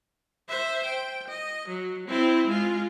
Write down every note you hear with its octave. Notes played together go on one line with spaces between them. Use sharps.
C5 E5
G5
D#5
F#3
C4 E4
G#3 F4